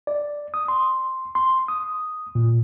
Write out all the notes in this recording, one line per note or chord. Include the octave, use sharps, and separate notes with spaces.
D5
D#6
C6
C6
D#6
A#2